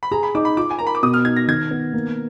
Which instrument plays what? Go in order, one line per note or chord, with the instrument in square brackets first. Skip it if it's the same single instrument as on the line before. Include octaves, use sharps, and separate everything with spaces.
[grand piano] B5
[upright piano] G#4 [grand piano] A#5
[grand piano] B5
[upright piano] D#4 [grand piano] D6
[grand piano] B5
[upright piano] F4 [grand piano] D6
[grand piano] G#5
[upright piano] A#4 [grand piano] A#5
[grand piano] B5
D6
[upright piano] B2 [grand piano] D#6
[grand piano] F6
[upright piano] D#4 [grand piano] G#6
[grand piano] A#6
[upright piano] D#3 [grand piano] G#6
[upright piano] B3
A#3